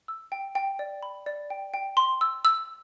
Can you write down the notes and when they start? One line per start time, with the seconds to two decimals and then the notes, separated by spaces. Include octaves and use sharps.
0.08 E6
0.32 G5
0.55 G5
0.79 D5
1.03 B5
1.26 D5
1.50 G5
1.74 G5
1.97 C6
2.21 E6
2.45 E6